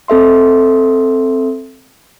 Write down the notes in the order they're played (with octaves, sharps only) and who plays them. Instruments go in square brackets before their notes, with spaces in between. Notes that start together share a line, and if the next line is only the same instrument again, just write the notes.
[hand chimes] C4 A4 E5 C6